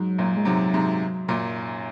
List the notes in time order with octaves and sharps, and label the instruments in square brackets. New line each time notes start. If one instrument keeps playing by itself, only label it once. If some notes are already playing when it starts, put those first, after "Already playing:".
Already playing: [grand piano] G#2 [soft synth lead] F#3
[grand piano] F#2 A#2
[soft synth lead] G#3
[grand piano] G#2 C3 [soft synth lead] F#3
[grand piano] G#2 C3
F#2 A#2